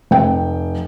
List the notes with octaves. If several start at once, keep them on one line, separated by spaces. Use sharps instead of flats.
F1 G5